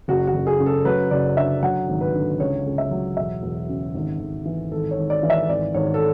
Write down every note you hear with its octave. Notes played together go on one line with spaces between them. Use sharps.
F#1 F#4
F#4
F#1
G#4
C#3
A4
F#3 B4
F#1 D5
D3 E5
F#3 F#5
G#1
B4
D3
C#2 C#5
C#2
E5
F#3
E1 E5
E1
C#3
G#1
G#1
E3
G#1 A4
C#5
G#1
D5
E3
E5
G#1 D5
G#1 C#5
A4